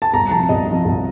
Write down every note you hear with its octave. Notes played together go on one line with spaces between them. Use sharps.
A5
C2 A#5
C3 F3 A5
C2 D#5
C3 F3
C2